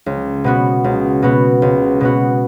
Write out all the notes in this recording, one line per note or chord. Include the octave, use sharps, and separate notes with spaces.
C#2
B2 B3 F#4
C#2
B2 B3 F#4
C#2
B2 B3 F#4